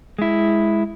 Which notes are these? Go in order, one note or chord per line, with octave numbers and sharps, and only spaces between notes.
G#3 E4